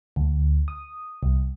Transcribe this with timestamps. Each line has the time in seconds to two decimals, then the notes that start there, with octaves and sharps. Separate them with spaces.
0.16 D2
0.68 D#6
1.23 C2